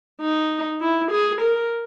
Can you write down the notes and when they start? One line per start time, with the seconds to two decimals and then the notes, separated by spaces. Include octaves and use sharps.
0.21 D#4
0.81 E4
1.11 G#4
1.41 A#4